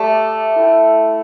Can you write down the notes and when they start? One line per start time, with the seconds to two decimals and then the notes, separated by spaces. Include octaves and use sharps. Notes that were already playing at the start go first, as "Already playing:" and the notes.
Already playing: A3 G4 D5 A5
0.56 E4 A4 G5